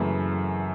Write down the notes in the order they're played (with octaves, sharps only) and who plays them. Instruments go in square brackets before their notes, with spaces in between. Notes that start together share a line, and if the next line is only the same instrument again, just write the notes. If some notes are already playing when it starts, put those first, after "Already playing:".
Already playing: [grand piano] F#1 F#2 C#3 E3 A3